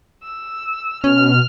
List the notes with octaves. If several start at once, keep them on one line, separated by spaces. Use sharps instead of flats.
E6
B2 C#4 F6